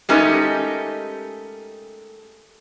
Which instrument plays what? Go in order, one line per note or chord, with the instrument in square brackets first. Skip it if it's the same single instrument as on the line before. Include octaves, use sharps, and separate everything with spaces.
[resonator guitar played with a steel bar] G#3 A3 C#4 D#4 G4 A#4